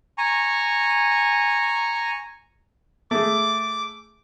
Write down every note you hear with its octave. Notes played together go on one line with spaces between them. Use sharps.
G#5 A#5 C#6
A3 G#4 D6